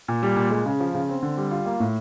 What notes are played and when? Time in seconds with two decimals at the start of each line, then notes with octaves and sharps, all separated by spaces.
0.08 A#2
0.23 G3
0.36 A#2
0.51 G#3
0.66 C#3
0.80 F3
0.94 C#3
1.09 C4
1.23 D3
1.38 G3
1.51 F4
1.66 A#3
1.80 A2